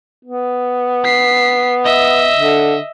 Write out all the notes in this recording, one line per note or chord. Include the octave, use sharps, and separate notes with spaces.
B3
B6 C7
D#5 E5
D3